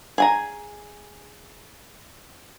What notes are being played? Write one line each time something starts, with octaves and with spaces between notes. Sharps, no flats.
G#4 G#5 A#5